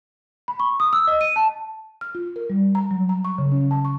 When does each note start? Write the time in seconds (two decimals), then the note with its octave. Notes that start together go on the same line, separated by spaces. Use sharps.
0.48 B5
0.60 C#6
0.80 D#6
0.93 E6
1.07 D#5
1.21 D#7
1.36 A5
2.01 F6
2.15 F4
2.36 A#4
2.50 G3
2.75 A#5
2.91 F#3
3.09 A#5
3.25 C#6
3.38 C#3
3.52 C#4
3.71 A5
3.85 C#6